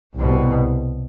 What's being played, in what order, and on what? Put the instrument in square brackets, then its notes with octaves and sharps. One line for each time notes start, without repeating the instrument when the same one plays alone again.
[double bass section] C2 B2